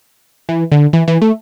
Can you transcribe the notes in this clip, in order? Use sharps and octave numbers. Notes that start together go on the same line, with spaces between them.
E3
D3
E3
E3
A3